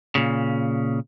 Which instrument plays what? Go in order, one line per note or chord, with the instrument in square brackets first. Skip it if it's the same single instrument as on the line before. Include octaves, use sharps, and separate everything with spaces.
[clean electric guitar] A#2 C#3